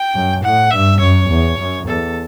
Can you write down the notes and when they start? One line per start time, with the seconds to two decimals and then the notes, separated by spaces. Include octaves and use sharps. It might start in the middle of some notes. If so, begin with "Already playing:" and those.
Already playing: G5
0.14 F#2
0.43 A2 F#5
0.71 G2 E5
1.00 F#2 C#5
1.29 E2
1.59 F#2
1.87 E2 A4